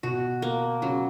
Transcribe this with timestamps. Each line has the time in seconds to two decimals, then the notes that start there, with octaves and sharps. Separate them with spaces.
0.03 B2 F#4
0.42 A#3
0.82 C#3 F#3